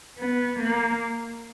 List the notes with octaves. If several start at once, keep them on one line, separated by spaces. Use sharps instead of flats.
B3
A#3